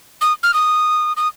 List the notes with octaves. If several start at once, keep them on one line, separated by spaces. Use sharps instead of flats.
D#6
F6
D#6
D#6